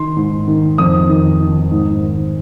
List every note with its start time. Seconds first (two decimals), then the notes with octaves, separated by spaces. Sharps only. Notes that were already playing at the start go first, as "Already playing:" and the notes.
Already playing: D#3 C6
0.17 G#2
0.48 D#3
0.78 F2 D#6
1.09 D#3
1.41 D#3
1.72 G#2
2.03 D#3